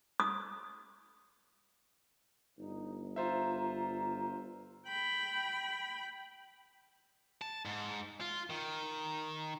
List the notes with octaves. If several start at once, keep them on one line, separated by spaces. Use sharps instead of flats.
D#6
G1 D#4
F4 C5 E5 A#5
G5 B5
A5
G#2
F4
D#3